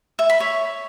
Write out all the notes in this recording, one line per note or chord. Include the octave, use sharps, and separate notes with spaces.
E5
B5
C#5